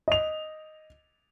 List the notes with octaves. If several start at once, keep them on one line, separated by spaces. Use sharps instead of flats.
D#5 F7